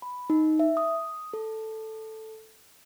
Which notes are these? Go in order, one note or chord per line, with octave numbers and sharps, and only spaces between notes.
B5
D#4
E5
D#6
A4